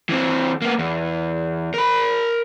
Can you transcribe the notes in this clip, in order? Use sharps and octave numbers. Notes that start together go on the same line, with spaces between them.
E3 C4
A#3 B3
E2
A#4 B5